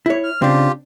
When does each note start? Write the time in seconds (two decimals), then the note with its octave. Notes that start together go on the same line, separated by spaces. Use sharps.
0.06 E4 C#5
0.23 F6
0.42 C#3 C4 D4 F4 G4